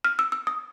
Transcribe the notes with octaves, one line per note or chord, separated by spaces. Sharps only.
F6
E6
E6
D#6